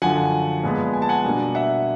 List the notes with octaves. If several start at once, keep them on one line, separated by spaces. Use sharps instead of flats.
F#2 D3 F3 F#5 G#5
A#2 F3 G#3 B3
G#5
A5
F#5 G#5
B2 G3 A#3 D4
E5 F#5